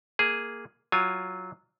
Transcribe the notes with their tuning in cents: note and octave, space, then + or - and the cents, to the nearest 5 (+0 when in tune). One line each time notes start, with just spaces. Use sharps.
A#3 +0 G#4 +0
F#3 +0 F4 +0 G#5 +0